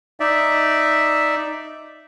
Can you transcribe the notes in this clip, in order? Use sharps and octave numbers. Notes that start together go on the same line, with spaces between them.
D#4 D5 E5